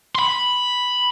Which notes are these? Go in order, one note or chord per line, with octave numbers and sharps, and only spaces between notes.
B5 C6